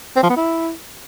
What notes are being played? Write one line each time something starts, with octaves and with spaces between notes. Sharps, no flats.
C4
F3
B3
E4